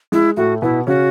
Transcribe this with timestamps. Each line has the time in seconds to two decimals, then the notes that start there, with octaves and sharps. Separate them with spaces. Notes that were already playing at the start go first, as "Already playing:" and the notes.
0.12 G#3 E4
0.37 A2 A3 F#4
0.62 B2 B3 E4
0.87 C#3 C#4 F#4